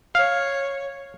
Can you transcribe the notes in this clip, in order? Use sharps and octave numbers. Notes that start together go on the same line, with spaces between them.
C#5 F5